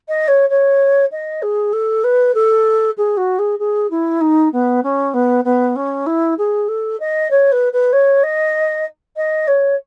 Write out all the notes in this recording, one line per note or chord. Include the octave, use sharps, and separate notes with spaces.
D#5
C#5
C#5
D#5
G#4
A4
B4
A4
G#4
F#4
G#4
G#4
E4
D#4
B3
C#4
B3
B3
C#4
E4
G#4
A4
D#5
C#5
B4
B4
C#5
D#5
D#5
C#5